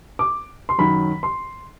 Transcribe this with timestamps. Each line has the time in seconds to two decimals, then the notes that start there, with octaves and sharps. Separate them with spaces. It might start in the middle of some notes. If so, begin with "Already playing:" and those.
0.19 D6
0.69 C6
0.78 F#2 D#3 F#3 B5
1.23 C6